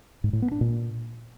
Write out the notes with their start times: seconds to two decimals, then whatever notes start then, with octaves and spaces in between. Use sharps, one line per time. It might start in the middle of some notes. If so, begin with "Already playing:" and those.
0.24 G#2
0.33 A2
0.42 B3
0.52 D4
0.61 A#2